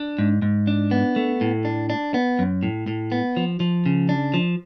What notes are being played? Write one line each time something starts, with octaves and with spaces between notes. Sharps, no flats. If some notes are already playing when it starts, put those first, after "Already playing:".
Already playing: D4
G#2
G#2
D4
B3
A3
A2
D4
D4
B3
F#2
A2
A2
B3
F3
F3
C#3
D4
F3